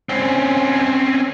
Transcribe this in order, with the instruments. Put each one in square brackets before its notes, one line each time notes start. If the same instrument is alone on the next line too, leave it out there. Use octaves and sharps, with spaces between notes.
[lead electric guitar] C4 C#4